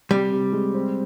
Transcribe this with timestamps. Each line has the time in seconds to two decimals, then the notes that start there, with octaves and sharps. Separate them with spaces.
0.11 C3 G3
0.31 C3
0.53 G#3
0.74 C4